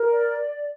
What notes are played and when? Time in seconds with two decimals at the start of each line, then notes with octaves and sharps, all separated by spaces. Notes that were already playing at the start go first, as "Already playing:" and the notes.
Already playing: A#4
0.12 D5